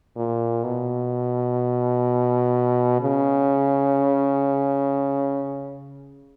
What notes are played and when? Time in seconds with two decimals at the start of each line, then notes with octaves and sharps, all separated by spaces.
0.16 A#2
0.64 B2
3.01 C#3